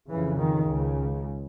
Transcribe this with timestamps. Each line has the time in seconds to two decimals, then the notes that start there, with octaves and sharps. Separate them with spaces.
0.11 F2 C#3 E3
0.40 D#3
0.68 C#2 C#3